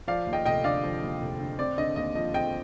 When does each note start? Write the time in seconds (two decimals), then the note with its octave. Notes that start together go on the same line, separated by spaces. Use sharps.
0.07 F3 D5 F5
0.27 D#2
0.33 D#5 G5
0.46 F1 D#5 G5
0.64 D3 D5 F5
0.83 F3
1.02 D#2
1.21 F1
1.40 D3
1.59 C4 D5
1.78 D3 D#5
1.96 D#2 D#5
2.15 F3 D#5
2.34 C4 D#5 G5